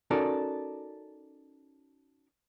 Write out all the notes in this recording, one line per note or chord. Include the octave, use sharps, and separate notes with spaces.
C#4 D#4 F#4 A4 A#4 D5